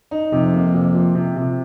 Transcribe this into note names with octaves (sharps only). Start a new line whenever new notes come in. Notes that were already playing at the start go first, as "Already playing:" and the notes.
D#4
F2 C3
A#3
C3
F3
C3
C3